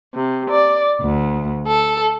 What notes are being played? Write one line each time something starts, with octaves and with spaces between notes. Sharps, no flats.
C3
D5
D2
A4